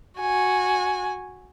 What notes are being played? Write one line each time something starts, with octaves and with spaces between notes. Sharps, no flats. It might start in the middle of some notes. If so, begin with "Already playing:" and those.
F#4 G#5